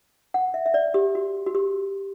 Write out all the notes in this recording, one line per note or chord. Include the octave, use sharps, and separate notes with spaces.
F#5
E5
E5
D5
G4
F#4
F#4
G4